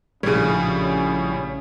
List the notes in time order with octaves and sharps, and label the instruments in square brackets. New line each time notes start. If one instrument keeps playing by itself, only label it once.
[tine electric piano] A#1 [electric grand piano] A2 G3 [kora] C#3 C#5 [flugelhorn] C#4